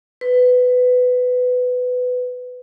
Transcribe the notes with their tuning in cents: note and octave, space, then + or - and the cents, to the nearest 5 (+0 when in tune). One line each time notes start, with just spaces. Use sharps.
B4 +15